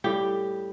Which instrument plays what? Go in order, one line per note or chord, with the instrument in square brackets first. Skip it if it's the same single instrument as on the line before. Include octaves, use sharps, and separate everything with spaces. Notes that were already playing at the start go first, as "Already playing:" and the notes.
[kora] A2 G3 G4